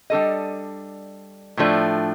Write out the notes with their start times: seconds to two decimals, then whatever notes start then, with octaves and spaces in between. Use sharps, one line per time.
0.10 G3 D4 A4 D#5
1.57 A2 F3 A3 D4